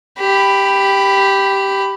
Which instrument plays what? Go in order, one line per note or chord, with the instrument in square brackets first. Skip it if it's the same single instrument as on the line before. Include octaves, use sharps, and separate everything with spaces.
[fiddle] G4 B5